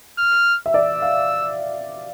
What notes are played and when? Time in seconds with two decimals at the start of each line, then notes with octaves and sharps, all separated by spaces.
0.18 F6
0.66 E5
0.74 D5 E6
1.02 F5